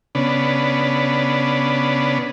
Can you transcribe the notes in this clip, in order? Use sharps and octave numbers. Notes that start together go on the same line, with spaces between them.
C#3 B3 D4